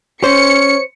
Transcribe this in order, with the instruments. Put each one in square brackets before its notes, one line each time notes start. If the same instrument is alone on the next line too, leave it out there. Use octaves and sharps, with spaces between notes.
[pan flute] C#4 [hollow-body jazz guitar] C5 [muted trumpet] C#5 [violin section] C#7